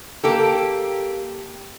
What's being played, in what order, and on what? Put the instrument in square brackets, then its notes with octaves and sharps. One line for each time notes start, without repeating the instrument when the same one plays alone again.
[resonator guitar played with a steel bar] A#3 G4 A4